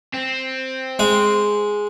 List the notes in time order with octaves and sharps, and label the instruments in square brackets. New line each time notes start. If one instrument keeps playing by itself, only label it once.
[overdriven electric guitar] C4
[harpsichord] G#3